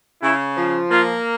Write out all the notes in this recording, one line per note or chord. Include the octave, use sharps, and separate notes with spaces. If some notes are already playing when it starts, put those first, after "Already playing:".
C#3 E4
F3
A#3 F4